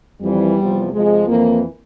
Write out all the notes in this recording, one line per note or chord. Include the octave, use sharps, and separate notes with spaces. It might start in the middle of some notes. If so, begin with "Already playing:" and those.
F2 E3 G3
E2 C3 F3
F2 C3 F3 G#3
F2 E3 A#3